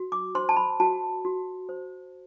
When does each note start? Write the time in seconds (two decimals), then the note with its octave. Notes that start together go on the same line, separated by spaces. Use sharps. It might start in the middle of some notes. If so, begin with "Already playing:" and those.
Already playing: F#4
0.12 D6
0.35 C5 C6
0.49 A5
0.57 B5
0.80 F#4 A5
1.25 F#4
1.69 C5